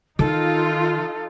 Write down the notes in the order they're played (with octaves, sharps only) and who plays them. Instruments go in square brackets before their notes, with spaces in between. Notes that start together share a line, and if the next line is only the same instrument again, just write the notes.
[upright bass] D#3 [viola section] D#4 F4 [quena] A4